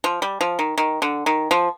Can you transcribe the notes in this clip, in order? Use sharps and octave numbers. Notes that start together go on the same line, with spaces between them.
F3
G3
F3
D#3
D#3
D3
D#3
F3